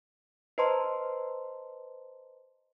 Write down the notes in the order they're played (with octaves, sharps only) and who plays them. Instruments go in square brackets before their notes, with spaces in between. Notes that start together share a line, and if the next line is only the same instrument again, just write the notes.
[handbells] B4 C5 D#5 A5 A#5 C6